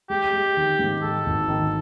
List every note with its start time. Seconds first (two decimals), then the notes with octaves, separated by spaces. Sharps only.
0.10 G#3 G4
0.33 G#3
0.57 D#3
0.79 G#2
1.03 G#3 A4
1.26 G#1
1.49 D#3